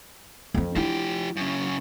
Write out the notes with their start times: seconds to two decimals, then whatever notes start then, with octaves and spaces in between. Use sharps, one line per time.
0.54 F2 C4
0.76 F3 D4 E4 G4
1.36 F#2 C#3